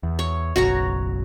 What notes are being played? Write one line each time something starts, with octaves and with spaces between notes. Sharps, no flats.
E2
C#5
F#1 B1 F#4 C#5 A#5